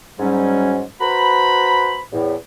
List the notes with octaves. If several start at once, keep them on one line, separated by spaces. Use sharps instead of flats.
G#2 F#3 G3 C#4
F#4 B4 C5 A#5 B5
E2 A2